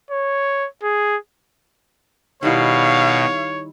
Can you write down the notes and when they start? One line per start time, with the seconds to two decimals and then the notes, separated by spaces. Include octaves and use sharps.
0.11 C#5
0.83 G#4
2.43 B2 D#3 G3 E4 C#5 F5